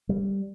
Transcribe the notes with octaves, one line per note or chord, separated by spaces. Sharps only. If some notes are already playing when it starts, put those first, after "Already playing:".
G3